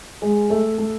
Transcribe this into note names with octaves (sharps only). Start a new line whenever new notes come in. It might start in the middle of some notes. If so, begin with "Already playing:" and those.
G#3
A3
A3